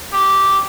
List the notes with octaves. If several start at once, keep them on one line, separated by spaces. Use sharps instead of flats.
G4